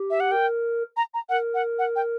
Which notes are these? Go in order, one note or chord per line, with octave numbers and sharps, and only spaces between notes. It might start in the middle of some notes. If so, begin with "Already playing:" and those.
Already playing: G4
E5
F#5
A#4 G5
A#5
A#5
A#4 F#5
F#5
F#5
G5